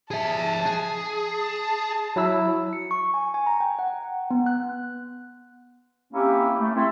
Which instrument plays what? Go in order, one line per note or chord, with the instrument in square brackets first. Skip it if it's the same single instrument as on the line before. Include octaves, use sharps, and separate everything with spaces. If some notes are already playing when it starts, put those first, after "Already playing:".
[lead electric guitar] G#4 E5 [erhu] A5
[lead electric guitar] G#4
[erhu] A5
[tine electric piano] F#3 E4 E6
[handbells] C#7
C#6
G#5
G#5
A#5
G5
F#5
B3
F#6
[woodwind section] A#3 C4 C#4 E4 G4
A3
A3 C4 E4 A4